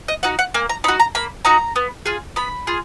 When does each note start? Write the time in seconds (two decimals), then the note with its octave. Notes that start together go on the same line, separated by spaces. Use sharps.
0.08 D#5
0.23 D#4 F#4 F#5
0.39 F#5
0.54 A#3 G#5
0.69 A#5
0.84 D#4 B5
0.88 F#4
1.00 A#5
1.15 A#3 B5
1.45 D#4 F#4 A#5
1.76 B3
2.06 F4 G#4
2.36 B3 B5
2.67 F4 G#4